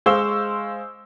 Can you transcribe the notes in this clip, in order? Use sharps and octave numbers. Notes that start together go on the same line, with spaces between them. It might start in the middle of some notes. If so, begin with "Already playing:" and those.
G#3 C5 F5 C#6 E6 G7